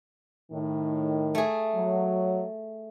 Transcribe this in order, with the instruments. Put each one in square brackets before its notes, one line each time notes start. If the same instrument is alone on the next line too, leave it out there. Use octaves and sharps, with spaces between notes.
[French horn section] A2 D#3
[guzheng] A3 G#4
[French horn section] F#3